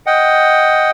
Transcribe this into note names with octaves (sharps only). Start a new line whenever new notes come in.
D#5 F#5 G5